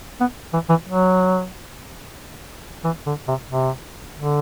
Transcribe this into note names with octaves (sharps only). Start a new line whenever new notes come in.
B3
E3
E3
F#3
E3
D3
C3
C3
D3